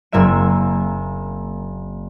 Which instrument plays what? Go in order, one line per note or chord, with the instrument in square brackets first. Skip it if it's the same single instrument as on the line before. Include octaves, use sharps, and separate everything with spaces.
[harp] F#1 A#3 C4 E5 E7